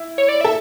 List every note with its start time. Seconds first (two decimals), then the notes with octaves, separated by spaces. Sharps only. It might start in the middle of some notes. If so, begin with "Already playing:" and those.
Already playing: E4
0.18 C#5
0.29 D5
0.41 A4 E5